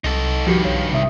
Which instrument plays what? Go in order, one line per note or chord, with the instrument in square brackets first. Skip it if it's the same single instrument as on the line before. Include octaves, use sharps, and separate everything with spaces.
[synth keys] C2 [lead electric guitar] D#4 A4
[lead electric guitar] G2 D#3 [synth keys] F3 F#4 G4
[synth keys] B1 C#5 F5
C3 E5 D#6